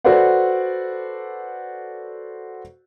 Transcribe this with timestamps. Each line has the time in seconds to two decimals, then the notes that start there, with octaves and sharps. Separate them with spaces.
0.04 F#4 A4 B4 C5 D5 F#5